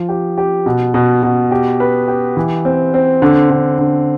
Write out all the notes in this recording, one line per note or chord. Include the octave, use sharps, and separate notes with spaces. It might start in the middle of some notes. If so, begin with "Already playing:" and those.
Already playing: F3
G4
G4
B2
B2
B2
G4
B4
G4
E3
C4
C4
D3
D3
D3